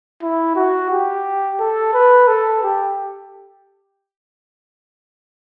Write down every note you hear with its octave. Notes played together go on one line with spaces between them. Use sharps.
E4
F#4
G4
A4
B4
A4
G4